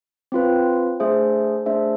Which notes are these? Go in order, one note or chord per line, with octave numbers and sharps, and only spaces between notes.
C4 F4 B4
A3 D4 G#4 C5 E5
A3 D4 G#4 C5 E5